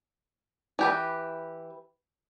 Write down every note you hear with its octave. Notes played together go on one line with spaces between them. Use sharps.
E3 G4 B4